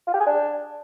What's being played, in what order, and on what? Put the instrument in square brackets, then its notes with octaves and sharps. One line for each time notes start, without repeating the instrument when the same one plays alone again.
[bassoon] F4
G4
G#4
D4